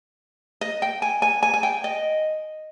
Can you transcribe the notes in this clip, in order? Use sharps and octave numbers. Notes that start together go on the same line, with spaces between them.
D#5
G5
G#5
G#5
G#5
G#5
G5
D#5